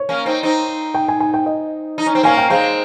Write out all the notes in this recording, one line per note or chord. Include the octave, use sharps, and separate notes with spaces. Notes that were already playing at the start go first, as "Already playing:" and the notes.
Already playing: C#5
A#3 C#4
C4 D#4
C4 D#4
G5
G#5
G#5
G5
D#5
D#4
C#4
C4
A#3 C#4 G#5
G5
G#3 C4 F5